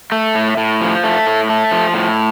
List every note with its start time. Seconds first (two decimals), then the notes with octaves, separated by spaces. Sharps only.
0.12 A3
0.35 A2
0.57 A2
0.81 F3
1.04 A3
1.27 A2
1.50 A3
1.71 F3
1.94 A2